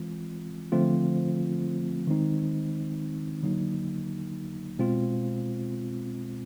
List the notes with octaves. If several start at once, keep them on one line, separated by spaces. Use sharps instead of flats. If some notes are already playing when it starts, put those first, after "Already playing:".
Already playing: E3 G#3 C4 F4
D3 F3 A3 C4 F4
D#3 G#3 C4 D#4
D3 F#3 A#3 D#4
B2 G#3 C4 F4